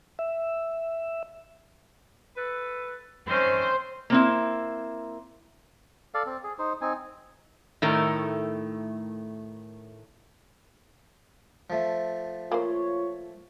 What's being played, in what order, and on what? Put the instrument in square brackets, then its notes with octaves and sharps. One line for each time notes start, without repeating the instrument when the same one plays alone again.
[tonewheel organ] E5
[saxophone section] A4 B4
[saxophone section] D#3 C4 C#4 [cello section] C5
[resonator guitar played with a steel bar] A#3 C4 E4
[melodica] A4 D5 F5
C4
G#4
D#4 C5
C4 D#4 G#5
[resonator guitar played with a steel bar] A2 D#3 A3 A#4
[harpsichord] F3 A3
[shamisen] A#3 C5 [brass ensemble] F4 C#5